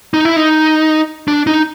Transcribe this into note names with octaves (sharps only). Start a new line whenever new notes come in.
D#4
E4
D#4
D4
D#4